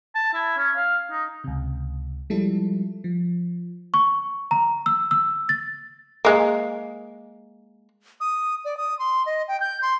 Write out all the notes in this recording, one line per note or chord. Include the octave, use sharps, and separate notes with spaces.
A5
E4
C#4
F5
D#4
C#2 C3
F3 G3 G#3 E4 A4
F3
C#6
A#5
E6
E6
A6
G#3 A#3
D#6
D5
D#6
C6
D#5
G5
G6
C6